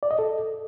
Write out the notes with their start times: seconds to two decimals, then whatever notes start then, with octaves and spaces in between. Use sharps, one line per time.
0.03 D5
0.11 D#5
0.19 A4